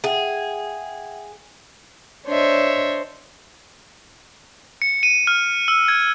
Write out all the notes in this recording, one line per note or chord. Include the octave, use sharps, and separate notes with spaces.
G#4 E5 F#5 G5
D4 C5 C#5 D#5 E5
C#7
D#7
F6
E6
G#6